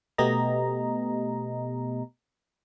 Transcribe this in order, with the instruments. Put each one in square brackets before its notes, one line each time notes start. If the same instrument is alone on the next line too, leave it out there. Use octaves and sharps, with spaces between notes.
[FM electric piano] B2 A3 B3 G4 D#5 A#5